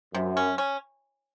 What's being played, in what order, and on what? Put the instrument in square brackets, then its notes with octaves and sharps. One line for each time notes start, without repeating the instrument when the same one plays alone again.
[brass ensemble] F#2 [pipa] C3
[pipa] C#4
C#4